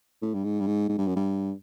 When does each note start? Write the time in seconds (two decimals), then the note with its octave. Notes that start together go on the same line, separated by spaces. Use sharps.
0.22 A2
0.34 G2
0.44 G#2
0.60 G2
0.67 G#2
0.89 G#2
0.98 G2
1.07 F#2
1.16 G2